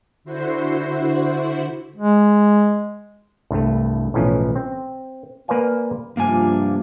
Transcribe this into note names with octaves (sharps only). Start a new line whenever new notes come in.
D3 E4 F#4 C5
G#3
C2 G2 A3
B1 A2 E3 F3 C#4
C4
A#3 B4 C5 D5 F5 G#5
G2 C3 F3 A#3 D4 G#5